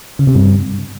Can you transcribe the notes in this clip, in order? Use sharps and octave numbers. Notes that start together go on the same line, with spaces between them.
C#3
C3
G2